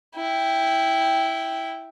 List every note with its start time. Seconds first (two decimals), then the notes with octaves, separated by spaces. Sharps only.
0.15 E4 G5